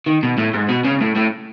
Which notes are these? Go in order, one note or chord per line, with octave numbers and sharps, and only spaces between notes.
D#3
B2
A2
G#2
B2
C#3
A2
A2